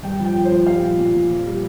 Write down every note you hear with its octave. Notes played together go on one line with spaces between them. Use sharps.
G2 G5
F3
G5
F3
C5
F3
G3 F5
A#2
A#2
A#2
F2
G3